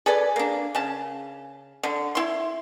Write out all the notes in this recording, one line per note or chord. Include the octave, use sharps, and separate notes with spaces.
G#4 A4 B4 D5
A#3 D4
C#3 A5
D3
E4 C6